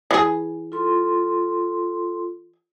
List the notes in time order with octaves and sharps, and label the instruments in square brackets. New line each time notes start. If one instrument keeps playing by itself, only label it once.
[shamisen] E3 G#4
[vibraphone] F4 A4 C6